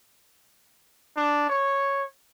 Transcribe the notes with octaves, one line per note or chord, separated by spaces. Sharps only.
D4
C#5